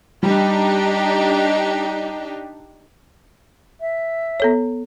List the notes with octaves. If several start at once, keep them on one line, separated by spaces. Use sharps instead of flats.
G3 D4 D#4 G4
E5
B3 A4 C#5